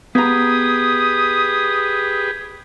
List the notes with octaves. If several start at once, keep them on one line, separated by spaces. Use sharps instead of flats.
B3 G4 G#4 B4 A#5 D#6